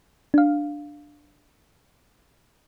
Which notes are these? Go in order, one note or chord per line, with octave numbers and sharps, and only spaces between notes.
D4 F5